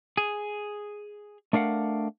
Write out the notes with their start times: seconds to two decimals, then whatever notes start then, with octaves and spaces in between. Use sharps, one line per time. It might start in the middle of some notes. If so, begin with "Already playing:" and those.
0.17 G#4
1.53 A3 D4 A#4 F5 F#5